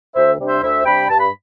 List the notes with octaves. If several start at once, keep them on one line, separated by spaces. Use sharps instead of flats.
D2 C5 E5
C3 G3 D4
C5 E5
D2 C5 E5
C3 G3 D4 G5 B5
G2 A5
B5